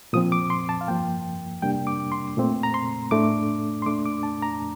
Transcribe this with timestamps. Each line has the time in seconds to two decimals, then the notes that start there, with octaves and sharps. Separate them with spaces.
0.13 A#2 F3 C4 D#6
0.32 D6
0.50 C6
0.69 A5
0.81 F5
0.88 G2 F3 A#3 G5
1.62 C3 G3 A#3 D4 G5
1.87 D6
2.12 C6
2.37 A#2 A3 C4
2.63 A#5
2.74 C6
3.11 A2 A3 D4 D6
3.82 C6
3.86 A#2 A3 D4 D6
4.06 D6
4.23 A5
4.42 A#5